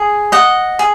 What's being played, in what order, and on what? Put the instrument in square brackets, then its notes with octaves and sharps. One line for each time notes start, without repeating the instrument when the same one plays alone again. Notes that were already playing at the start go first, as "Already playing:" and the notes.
Already playing: [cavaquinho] G#4
D#5 F#5
G#4